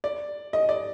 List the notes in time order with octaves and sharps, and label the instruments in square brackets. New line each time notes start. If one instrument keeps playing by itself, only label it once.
[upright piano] D5
D#5
D5